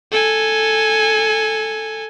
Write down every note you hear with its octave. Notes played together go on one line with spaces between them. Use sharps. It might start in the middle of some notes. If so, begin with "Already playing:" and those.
A4 G#5